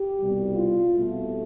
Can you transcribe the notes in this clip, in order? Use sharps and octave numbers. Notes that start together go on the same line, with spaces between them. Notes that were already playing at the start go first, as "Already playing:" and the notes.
Already playing: G4
C2 B2 G3
F4
C2 B2 A3